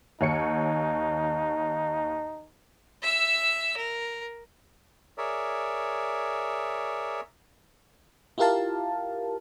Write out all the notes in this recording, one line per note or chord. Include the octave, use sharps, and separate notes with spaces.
D#2 D#4 C#5 C#7
E5 E6
A#4
G#4 A#4 C#5 D5 E5
E4 F4 G4 A#4 F5 A5